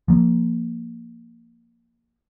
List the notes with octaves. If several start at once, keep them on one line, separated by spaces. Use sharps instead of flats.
F3 A#3